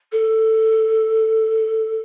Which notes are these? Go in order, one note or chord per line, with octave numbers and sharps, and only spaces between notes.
A4